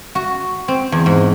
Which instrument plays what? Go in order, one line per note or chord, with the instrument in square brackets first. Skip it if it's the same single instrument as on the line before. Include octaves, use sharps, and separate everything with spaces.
[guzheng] F#4
C4
E2
G#2